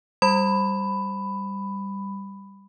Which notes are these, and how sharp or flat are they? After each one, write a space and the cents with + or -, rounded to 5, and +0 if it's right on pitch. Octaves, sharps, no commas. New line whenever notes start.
G3 +0 B5 +10